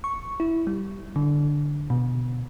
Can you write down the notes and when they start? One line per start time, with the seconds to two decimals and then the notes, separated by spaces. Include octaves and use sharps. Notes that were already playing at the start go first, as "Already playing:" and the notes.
0.04 C#6
0.40 E4
0.67 G3
1.16 D3
1.90 B2